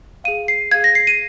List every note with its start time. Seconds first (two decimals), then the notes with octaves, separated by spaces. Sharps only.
0.24 G#4 F5 D#7
0.48 C7
0.71 G#4 F5 G#6
0.84 A#6
0.95 C7
1.07 D#7